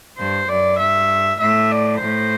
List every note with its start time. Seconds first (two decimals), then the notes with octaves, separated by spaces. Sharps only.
0.18 G2 C5
0.49 F#2 D5
0.79 G2 E5
1.40 A2 E5
1.71 D5
2.01 A2 C5